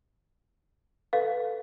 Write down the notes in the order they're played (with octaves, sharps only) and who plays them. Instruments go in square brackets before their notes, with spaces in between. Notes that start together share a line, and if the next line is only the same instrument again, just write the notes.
[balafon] A4 B4 [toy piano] F5